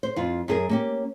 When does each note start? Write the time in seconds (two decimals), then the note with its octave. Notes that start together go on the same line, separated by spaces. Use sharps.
0.03 C5
0.16 F2 F4
0.48 F#2 G#4 A#4
0.69 A#3 C#4 G4